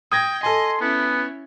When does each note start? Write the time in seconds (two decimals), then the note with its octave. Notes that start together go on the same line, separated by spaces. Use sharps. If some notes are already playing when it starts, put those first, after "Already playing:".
0.12 G5 D#6 G#6 A#6
0.43 A4 D#5 G#5 C6
0.81 B3 C#4 E4